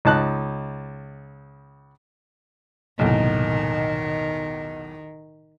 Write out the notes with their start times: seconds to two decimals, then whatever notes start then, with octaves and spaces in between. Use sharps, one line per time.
0.05 C#2 D#4 A5 F#6
2.99 B1 E2 A2 C3 D#3 A#3